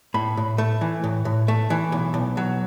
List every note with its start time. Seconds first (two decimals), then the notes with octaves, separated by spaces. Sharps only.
0.14 A2 B5
0.37 A2
0.58 A3
0.81 E3
1.04 A2
1.25 A2
1.48 A3
1.70 E3
1.92 B1
2.14 B1
2.37 F#3